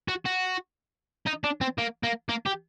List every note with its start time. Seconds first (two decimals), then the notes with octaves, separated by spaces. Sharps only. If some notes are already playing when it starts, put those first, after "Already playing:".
0.08 F#4
0.25 F#4
1.27 D#4
1.44 D4
1.61 C4
1.78 A#3
2.03 A#3
2.29 A#3
2.46 G4